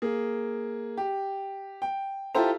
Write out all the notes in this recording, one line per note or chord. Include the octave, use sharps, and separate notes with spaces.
A#3 G#4
G4
G5
E4 F4 G4 A4 C5 A#5